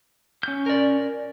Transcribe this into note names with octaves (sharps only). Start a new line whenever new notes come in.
C#4 G6
A#4 D5